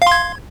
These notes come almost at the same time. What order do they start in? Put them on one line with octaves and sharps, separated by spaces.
F5 C6 G#6